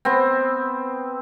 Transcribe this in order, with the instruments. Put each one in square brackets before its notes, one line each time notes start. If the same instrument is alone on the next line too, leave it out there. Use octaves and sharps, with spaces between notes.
[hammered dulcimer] B3 C4